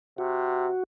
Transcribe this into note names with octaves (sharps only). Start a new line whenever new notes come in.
C3 F#4